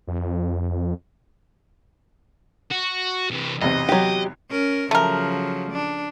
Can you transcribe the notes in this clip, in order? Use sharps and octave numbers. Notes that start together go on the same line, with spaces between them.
F2
F#4
C3 E3
B1 E2 C3 D#5
F#3 G4
C#4 A#4
C#3 F3 F#3 A3 A#4
D4